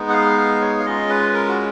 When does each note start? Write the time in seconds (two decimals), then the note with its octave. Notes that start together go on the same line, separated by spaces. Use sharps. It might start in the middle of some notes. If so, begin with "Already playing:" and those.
Already playing: G#3 B3 D#4
0.09 F#5
0.13 F5
0.38 F5
0.61 C#5
0.80 F5
0.85 G#3 C#4 F4 D#5
1.10 B4
1.34 A#4
1.49 F#4